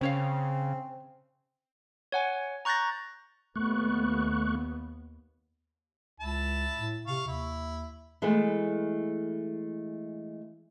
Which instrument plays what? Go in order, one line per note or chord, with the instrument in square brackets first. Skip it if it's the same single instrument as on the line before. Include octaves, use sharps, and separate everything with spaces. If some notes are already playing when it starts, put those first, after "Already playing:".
[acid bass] C#3 [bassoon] C4 [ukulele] C#4 C#5 F5
[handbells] C#5 F#5 G#5
A#5 C#6 F#6 G6 A6 A#6
[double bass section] D#2 B3 [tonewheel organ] A3 C#6 F#6
[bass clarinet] C#2 [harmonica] E4 A5
[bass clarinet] A2
[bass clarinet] C3 [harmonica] F5 C#6
[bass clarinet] D#2 [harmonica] E4
[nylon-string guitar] E3 G#3 A3 B3